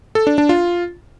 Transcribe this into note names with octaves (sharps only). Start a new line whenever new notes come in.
A4
D4
D4
F4